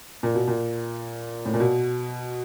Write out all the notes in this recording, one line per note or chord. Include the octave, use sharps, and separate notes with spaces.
A#2
B2
A#2
A2
A#2
B2